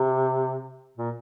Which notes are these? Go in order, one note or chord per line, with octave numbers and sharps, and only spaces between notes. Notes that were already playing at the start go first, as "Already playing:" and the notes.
Already playing: C3
A#2